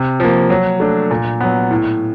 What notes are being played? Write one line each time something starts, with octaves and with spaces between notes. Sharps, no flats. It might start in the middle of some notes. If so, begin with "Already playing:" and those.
Already playing: C3
F3 A#3
F#3
A3 D4
A#2
F#3 B3
A2